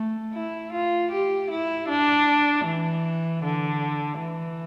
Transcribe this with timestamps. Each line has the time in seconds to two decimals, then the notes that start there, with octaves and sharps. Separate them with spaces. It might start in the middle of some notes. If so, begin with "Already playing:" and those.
Already playing: A3
0.34 E4
0.73 F4
1.11 G4
1.51 E4
1.89 D4
2.65 E3
3.43 D3
4.19 E3